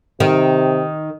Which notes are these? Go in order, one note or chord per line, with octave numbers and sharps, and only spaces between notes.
C3 D#3